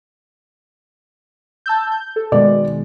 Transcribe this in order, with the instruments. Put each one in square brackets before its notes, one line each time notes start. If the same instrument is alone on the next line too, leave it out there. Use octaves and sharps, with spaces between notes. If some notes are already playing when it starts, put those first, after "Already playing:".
[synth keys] A5 E6 G6
G6
A4
[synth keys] B2 D#3 G#3 [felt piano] D5